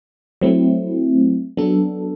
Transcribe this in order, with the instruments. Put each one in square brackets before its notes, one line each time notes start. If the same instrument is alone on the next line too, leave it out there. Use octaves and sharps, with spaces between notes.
[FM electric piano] F#3 A3 C4 E4
F#3 B3 D4 A4